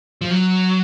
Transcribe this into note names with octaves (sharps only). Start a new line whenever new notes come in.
F3
F#3